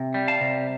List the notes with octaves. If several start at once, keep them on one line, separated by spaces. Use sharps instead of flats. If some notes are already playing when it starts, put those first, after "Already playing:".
Already playing: C3
G3
F5 A5
C3